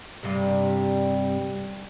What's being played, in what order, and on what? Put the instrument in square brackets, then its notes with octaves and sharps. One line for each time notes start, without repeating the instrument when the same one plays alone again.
[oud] G2 C3